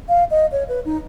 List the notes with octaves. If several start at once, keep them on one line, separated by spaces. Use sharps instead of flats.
F5
D#5
C#5
B4
D#4